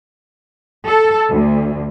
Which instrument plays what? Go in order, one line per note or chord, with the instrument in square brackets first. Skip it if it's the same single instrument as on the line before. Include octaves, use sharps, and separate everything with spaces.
[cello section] A4
D2